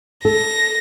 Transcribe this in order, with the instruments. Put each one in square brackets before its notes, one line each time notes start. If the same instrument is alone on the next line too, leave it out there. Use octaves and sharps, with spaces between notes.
[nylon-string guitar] A4 [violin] A#6